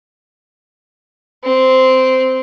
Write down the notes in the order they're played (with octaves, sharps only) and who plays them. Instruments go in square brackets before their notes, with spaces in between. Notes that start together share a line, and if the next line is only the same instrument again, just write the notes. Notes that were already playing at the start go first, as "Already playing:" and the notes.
[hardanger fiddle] C4